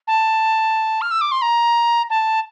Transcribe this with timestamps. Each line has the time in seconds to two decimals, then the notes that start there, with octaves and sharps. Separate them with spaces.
0.07 A5
1.01 F6
1.11 E6
1.21 D6
1.32 C6
1.42 A#5
2.10 A5